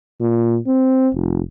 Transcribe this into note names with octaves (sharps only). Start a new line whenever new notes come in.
A#2
C4
F1